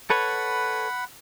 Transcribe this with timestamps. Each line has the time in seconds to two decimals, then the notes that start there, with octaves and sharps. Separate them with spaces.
0.10 A4 B4 C#5 F#5 B5